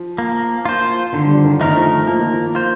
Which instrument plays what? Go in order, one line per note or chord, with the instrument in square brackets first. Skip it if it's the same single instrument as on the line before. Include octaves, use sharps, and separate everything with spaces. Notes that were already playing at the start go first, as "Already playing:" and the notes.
Already playing: [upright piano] F3
[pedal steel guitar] A#3
F4 C5
[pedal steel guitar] D3 [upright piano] D#3
[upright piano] G3
F3
D#3
[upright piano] D#3 [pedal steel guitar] A3 D#4 A#4
[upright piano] F3
[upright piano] F3 [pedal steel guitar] A#3
[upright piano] D#3
F3
[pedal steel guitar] F4 C5